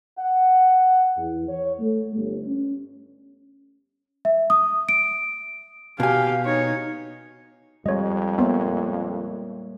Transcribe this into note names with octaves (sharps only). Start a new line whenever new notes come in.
F#5
E2
C#5
A3
G1
C#4
E5
D#6
D7
B2 G4 F5 G#5
D#4 C#5
F2 G3 G#3 C#5 D#5
A#3 B3 C#5 E5